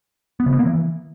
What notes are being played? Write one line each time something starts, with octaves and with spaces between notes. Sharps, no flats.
B3
C#3
B3
A#3
E3